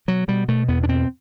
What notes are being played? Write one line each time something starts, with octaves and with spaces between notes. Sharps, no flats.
B2 F#3
B2 G3
B2 A3
E2 B3
D4
B2 C4